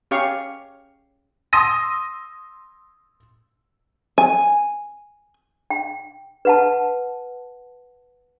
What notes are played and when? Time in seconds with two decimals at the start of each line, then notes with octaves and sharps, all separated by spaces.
0.11 C#4 G4 F5 C#6
1.53 C6 D#6 E6 A#6 D#7
4.18 G#5
5.70 G5
6.45 B4 F#5 A5